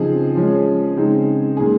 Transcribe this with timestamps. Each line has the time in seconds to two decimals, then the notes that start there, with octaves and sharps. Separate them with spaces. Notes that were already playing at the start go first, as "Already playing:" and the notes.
Already playing: C#3 F3 C4 D#4 G#4
0.35 F3 G#3 C#4
0.96 C#3 G#3 C4 D#4
1.57 A#2 G#3 D#4 G#4